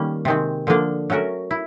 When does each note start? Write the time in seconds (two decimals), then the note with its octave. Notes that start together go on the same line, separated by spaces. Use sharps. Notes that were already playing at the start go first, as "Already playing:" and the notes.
Already playing: D#3 G3 A#3 C#4
0.25 C3 D#3 G#3 C4
0.67 D3 F3 A#3 D4
1.10 F#3 A3 C#4 F#4 A#4
1.51 E4